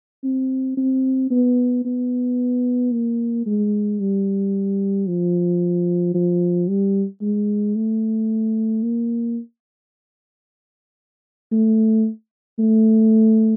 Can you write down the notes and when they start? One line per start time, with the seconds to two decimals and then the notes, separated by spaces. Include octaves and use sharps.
0.24 C4
0.77 C4
1.31 B3
1.85 B3
2.92 A#3
3.46 G#3
4.00 G3
5.07 F3
6.14 F3
6.68 G3
7.22 G#3
7.76 A3
8.83 A#3
11.52 A3
12.59 A3